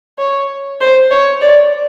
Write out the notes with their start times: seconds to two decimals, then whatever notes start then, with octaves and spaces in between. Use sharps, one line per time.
0.19 C#5
0.81 C5
1.11 C#5
1.42 D5